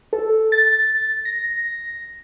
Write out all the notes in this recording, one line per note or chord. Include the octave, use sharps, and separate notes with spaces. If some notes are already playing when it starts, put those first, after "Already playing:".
A4
A6
A#6